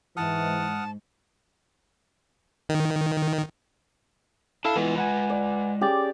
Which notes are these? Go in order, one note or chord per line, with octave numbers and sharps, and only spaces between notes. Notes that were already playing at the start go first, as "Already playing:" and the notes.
G#2 E3 F#5 A5 D#6 F6
D#3
D4 E4 A4 F5 A5
E3 G#3 B3 F4
B4 F#5 G#5
D5
C#4 G4 G#4 D5